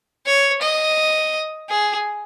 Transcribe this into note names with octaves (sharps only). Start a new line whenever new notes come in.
C#5
D#5
G#4